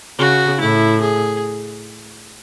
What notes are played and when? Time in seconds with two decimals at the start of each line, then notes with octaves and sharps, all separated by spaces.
0.18 C#3 F#4
0.60 A2 E4
1.01 G#4